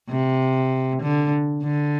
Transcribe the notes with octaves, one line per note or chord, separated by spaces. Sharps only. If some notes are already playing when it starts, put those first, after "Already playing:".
C3
D3
D3